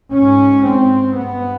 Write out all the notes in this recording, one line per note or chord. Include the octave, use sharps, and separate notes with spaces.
G#2 C#4
C4
G2 B3